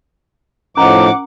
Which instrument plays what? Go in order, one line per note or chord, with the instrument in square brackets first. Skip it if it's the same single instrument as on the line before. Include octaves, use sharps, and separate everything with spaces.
[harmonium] A2 F3 D#4 [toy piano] C#4 A#4 A#5 [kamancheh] F#5 D6